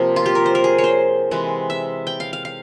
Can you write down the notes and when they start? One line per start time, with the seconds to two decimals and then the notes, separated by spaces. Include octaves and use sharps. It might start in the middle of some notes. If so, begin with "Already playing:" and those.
Already playing: C3 F3 A#3
0.16 F4
0.26 G4
0.35 A#4
0.46 C5
0.55 A#4
0.64 G#4
0.78 C#5
0.84 C5
1.31 C3 E3 G#3
1.70 E5
2.07 G5
2.20 F5
2.33 F5
2.45 F5